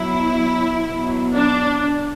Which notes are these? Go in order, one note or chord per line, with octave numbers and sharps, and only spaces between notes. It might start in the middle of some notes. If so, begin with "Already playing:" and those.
Already playing: B2 F#3 E4
B2 F#3
D4